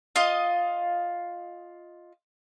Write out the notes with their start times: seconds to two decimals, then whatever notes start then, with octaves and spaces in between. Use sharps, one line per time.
0.16 F4 D#5